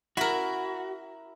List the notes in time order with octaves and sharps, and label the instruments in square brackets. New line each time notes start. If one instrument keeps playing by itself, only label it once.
[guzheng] E4 A#4 [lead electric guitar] F#4